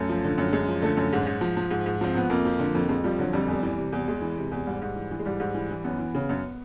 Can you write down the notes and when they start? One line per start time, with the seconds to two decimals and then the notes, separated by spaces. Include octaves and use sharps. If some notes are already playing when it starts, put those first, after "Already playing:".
Already playing: F#2 A3
0.09 F3
0.24 D3
0.38 F#2
0.53 F#2 G#3
0.68 F3
0.82 D3 A3
0.97 F#2
1.13 G#2
1.27 G#2
1.41 F3
1.57 F3
1.71 G#2
1.86 G#2
2.01 F3 C4
2.15 F3 B3
2.30 F2 A#3
2.45 F3
2.59 D3
2.75 F2
2.89 F2 G#3
3.04 F3 G3
3.19 D3 F#3
3.33 F2 G3
3.48 E2 G3
3.62 E3
3.77 C3
3.92 E2
4.08 E2 G#3
4.21 E3
4.37 C3
4.51 E2
4.66 G#2 G3
4.82 G#2
4.96 E3
5.11 E3
5.19 G#3
5.26 G#2 G3
5.40 G#2
5.54 E3
5.70 E3
5.84 F#2 B3
5.99 E3
6.15 C#3
6.29 F#2